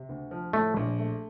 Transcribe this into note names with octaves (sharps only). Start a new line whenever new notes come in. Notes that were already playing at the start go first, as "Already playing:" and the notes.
Already playing: C3
D2
F3
A2 A3
A#1
A3